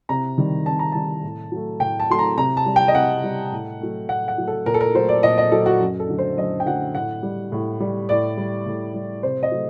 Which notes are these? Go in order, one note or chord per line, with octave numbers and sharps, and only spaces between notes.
C3 A#5
D#3 G3
C3 A5
A#5
D#3 G3 A5
A2
F#3 A3
A2 G5
A5
F#3 A3 C6
A#5
C3 A#5
A5
G3
G5
D#5
C3 F#5
G3
A2
F#3 A3
A2 F#5
F#5
F#3 A3
A4
A#2 A#4
A4
A#4
F#3 A3 C5
D5
A#2 D#5
D#5
F#3 A3 A4
F#4
F#2
A4
D3 F#3 A3
C5
F#2 D#5
G5
D3 F#3 A3 F#5
A2 F#5
G3
A2
G3
A2 D5
G3
A2
G3
C3 C5
D#5
F#3 A3